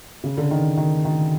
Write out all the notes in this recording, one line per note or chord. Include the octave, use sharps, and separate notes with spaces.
C#3
D3
D#3
D#3
D#3